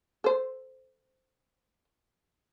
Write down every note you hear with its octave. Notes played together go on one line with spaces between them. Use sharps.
A4 C5